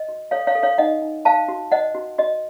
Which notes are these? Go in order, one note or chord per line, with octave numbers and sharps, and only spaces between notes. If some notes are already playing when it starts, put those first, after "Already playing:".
Already playing: D#5
F#4
A4 C#5 F5
C#5 F5
A4
C#5 F5
D#4 D#5 F#5
D#4
C5 F5 A5
F#4
C5 D#5 F#5
F#4
F#4 D#5